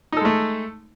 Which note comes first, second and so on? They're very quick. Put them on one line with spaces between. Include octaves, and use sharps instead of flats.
D#4 A4 G#3 A3